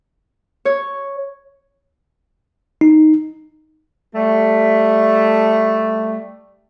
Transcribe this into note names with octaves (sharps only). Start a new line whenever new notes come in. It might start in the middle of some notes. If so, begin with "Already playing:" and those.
C#5
D#4
G3 A3